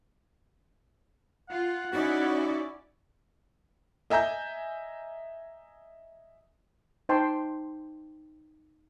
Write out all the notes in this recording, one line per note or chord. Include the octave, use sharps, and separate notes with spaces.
F4 F#5
C#4 D#4 E4 F#4 D5
D#5 E5 G#5 A#5 G6
D#4 C5 G5 A5 C6